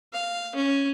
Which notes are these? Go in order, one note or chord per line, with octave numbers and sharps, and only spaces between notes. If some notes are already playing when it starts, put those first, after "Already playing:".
F5
C#4